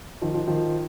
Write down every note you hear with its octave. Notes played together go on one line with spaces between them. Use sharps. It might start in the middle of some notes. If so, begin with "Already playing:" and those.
D#3 F3
D#3 F3
D#3 F3